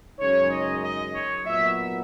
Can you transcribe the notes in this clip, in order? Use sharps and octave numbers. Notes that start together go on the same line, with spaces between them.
F#2 C#3 G#3 D#4 C#5
D#5
D#5
C#5
A#2 F#3 B3 D#4 E5